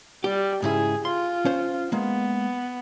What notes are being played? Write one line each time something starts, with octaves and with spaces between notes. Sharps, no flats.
G3 G4
G#2 C#3 E4 G#4
F4 C6
C#4 C5
G#3 A#3 B3